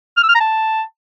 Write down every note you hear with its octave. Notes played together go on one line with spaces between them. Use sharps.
F6
E6
F6
A#5
A5